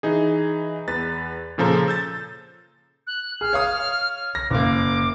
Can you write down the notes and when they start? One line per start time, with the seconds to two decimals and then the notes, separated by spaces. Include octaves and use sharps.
0.03 E3 D#4 G#4
0.88 E2 B4 A6
1.58 A#2 C#3 F3 A4 A#5
1.88 E6 G6 A6
3.07 F#6
3.41 G#4 F6
3.53 C#5 F5 D#6
4.35 A#6
4.50 F#1 A#3 D6